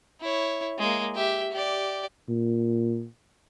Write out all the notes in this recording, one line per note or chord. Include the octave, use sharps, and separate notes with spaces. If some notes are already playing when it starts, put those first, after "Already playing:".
E4 C#5
G#3 A#3
G4 E5
G4 D5
A#2